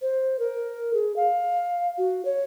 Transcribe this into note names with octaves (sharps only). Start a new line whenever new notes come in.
C5
A#4
G#4
F5
F#4
C#5